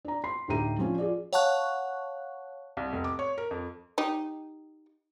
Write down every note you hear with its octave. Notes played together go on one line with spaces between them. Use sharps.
D4 A#5
B5 C6 C7
D2 A2 D#4 G4 A#5 D#7
F3 C#4 D4
F4 G#4 D5
C#5 F5 F#5 A5 C#6 F#6
C2
F1
D6
C#5
A#4
F2
D#4 G4